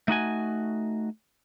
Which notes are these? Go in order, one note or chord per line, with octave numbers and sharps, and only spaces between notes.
A3 D#4 F#4 G#5